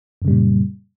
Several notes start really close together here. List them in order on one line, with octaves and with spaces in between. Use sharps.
F#2 C#3 G3 A#2